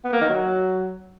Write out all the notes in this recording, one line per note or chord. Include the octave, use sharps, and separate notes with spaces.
B3
A#3
D#3
F#3